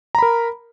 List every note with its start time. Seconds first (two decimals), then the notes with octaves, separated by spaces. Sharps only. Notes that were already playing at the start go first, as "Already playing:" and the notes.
0.15 A#5
0.19 B5
0.22 A#4